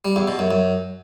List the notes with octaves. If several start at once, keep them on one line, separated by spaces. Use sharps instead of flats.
G3
E2
B2
F#2
F#2